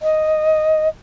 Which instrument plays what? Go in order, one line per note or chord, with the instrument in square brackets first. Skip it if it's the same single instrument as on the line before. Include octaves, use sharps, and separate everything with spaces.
[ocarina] D#5